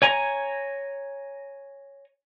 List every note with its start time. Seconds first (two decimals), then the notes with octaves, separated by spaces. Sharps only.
0.02 C#5 G#5 A#5